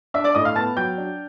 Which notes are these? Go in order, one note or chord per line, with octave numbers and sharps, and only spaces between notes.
D4 E5 E6
D5 D6
A2 D#5 D#6
F5 F6
B3 A5 A6
F#3 G5 G6
D4